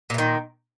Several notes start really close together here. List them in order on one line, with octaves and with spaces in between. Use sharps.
A#2 E3 D#3